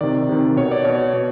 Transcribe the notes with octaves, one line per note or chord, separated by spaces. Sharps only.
C3 D#3 D5
C3 D#3
B2 C#5
D5
B2 C#5
B2